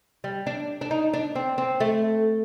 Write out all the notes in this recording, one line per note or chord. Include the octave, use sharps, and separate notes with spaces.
G3
D4
D4
D#4
D4
C4
C4
A3